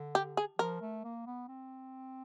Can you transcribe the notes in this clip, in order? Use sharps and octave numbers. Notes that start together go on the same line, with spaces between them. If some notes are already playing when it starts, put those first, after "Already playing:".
Already playing: D3
G4
G#4
F3 A#4
A3
A#3
B3
C4